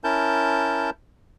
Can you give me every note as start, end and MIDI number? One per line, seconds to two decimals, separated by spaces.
0.04 0.90 61
0.04 0.90 64
0.04 0.90 70
0.04 0.90 81
0.04 0.90 91